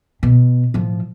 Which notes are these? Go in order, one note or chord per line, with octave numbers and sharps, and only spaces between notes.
B2
A2 F3